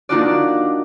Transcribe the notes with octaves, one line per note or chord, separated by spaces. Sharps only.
A#3 D4 D#4 F4 F#4 D5